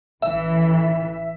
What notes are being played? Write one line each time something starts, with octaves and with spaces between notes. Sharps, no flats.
A1 E3 E5